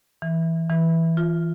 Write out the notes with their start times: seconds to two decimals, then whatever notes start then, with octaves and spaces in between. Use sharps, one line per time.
0.22 E3
0.69 E3
1.17 F4